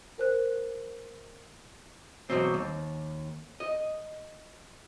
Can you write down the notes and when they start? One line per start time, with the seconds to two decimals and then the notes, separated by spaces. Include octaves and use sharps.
0.18 A#4 C5 F#6
2.30 E2 G2 B2 F#3 C4
2.54 D#2
3.60 D#5